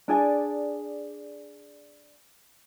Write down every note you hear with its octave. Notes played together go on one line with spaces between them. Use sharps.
D4 G#4 D5 G#5